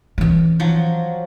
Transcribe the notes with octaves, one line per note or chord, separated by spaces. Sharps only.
E3 C#4
F3 F#3